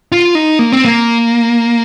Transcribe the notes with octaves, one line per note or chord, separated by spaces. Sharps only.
F4
D#4
A#3
C4
A#3